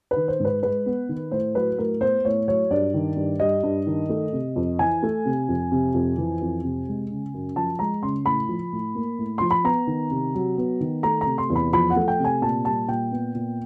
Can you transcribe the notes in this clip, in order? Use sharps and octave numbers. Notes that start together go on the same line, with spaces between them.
B4
D#3
C5
G#2 B4
G#3 B4
B3
D#3
A2 C5
F#3 B4
A2 A#4
B3 C5
A2 C#5
F#3 C#5
G2 D5
D#3
G2
G3 D#5
G2
D#3
A3
C3
F2
E3 G#5
A3
C3
F2
C3
F2
E3
F2
C3
G#3
C#3
F#2
F3 A5
G#3 A#5
C#3 C6
A2 B5
F3
A2
A#3
A2
F3 C6
B5
B3 A#5
D#3
C3
F#3
B3
D#3
A3 A#5
C3 A#5
C6
E2
B5
F3 B5
F#5
A3
G5
C3
G#5
A#2 A5
G3 A5
A#2 G5
B3
A#2